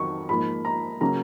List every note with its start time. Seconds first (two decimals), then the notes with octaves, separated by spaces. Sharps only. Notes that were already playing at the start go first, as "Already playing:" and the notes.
Already playing: F2 D#3 F#3 C#6
0.29 G#2 F3 A#3 B5
0.65 A#5
1.01 C#3 F#3 A#3 C#4 A#5